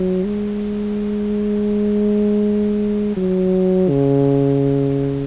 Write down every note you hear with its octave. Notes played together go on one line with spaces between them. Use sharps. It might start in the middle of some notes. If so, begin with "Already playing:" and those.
Already playing: F#3
G#3
F#3
C#3